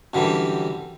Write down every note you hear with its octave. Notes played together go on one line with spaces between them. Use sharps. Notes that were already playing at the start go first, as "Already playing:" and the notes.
F#2 D3 E3 G3